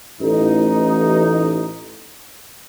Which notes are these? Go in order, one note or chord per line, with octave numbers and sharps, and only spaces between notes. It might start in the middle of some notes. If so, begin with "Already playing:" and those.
A1 D#4